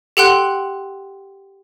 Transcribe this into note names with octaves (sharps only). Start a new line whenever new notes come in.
G4 A4 F#5 G5 C6 F#6